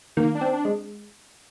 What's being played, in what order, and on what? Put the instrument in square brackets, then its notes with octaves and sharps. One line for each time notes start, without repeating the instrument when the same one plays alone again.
[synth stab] D#3 [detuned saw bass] A#3
[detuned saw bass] D4
[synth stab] C4
[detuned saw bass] D4
[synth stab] G#3